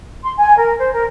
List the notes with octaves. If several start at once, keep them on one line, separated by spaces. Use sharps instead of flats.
C6
G#5
A#4
C5
A#4